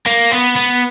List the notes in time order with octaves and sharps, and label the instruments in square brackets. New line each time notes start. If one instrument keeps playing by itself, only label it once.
[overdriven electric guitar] A#3
B3
B3